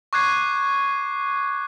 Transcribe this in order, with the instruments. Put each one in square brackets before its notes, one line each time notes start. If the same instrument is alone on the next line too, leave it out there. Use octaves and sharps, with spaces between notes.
[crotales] C#6 D6 F#6 G#6 C7